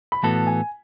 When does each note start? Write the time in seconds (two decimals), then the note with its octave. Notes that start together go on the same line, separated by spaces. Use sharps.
0.12 B5
0.23 A2 E3 B3 F#4 A4 A5
0.47 G#5